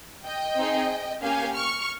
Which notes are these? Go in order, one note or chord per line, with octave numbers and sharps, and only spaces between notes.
D#5 G5
C4 D#4 G#4
A#3 C#4 G4 F5 G#5
C#6 F6